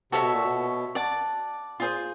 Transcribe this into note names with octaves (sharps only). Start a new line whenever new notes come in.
C3 F#4 A4 C#5 E5
B2
A#2
B2
D5 F#5 A5
A#2 F4 G#4 C5